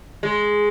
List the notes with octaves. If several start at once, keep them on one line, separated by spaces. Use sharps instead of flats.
G#3